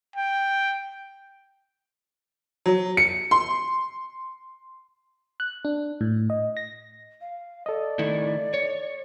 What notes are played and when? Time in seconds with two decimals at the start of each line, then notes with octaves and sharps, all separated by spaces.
0.16 G5
2.66 F#3
2.97 C#7
3.31 C6
5.40 F#6
5.65 D4
6.01 A2
6.30 D#5
6.57 A#6
7.21 F5
7.66 A4 D5 D#5
7.99 D#3 A3 E4
8.54 C#5